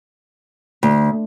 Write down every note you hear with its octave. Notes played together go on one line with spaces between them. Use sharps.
D2